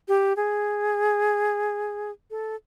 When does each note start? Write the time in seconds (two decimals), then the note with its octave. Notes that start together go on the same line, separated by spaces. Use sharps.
0.08 G4
0.37 G#4
2.31 A4